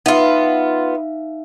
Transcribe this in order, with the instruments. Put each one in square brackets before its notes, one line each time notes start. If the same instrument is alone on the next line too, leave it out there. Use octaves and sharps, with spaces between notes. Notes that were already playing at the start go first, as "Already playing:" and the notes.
[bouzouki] B3 F4 [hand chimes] D#4 E5 F5